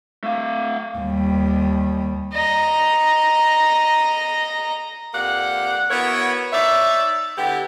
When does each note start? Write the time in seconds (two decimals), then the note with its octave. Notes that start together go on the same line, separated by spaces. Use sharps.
0.24 A3 F5
0.98 D#2 G3
2.33 D#5 A#5
5.14 F2 A#3 G4 D5 F#5
5.90 B3 C#4 E4 F#4 A#4 C#5
6.53 D#4 C#5 D5 E5
7.38 D3 B3 E4 G4